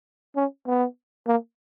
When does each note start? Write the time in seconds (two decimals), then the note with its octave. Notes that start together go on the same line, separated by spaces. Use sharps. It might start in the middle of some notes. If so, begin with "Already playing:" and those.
0.36 C#4
0.66 B3
1.27 A#3